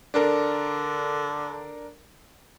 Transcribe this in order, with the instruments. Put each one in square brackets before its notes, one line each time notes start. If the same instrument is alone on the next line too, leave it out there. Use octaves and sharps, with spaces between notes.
[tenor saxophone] D3 [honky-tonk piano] D4 A4 A#4